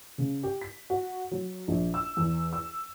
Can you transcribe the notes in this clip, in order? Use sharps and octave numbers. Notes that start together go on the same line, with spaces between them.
C#3
G4
B6
F#4
F#3
A#1
E6
E2
E6